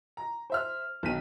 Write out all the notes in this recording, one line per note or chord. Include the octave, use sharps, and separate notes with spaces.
A#5
C5 E5 F6
B1 D#3 B6 D#7